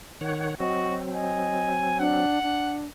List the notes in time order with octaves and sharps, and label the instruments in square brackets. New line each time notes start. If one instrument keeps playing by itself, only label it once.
[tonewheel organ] D#3 C#5 F#5
[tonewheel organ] F#3 C4 [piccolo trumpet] F#4 [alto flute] D#5
[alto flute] D#5 [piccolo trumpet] G#5
[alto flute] D4 [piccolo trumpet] F#5
[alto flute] D4